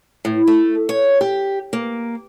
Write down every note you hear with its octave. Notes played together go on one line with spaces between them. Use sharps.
A2
A3
C#5
G4
A#3